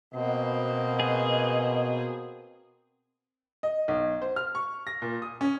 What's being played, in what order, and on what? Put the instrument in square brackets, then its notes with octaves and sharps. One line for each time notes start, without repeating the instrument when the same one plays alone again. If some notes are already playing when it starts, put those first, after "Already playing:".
[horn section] B2 [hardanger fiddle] A#3 C4 [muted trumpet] D#5
[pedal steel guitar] G#4
[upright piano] D#5
B1
C5
F6
C#6
A#6
A#2
D#6
C#4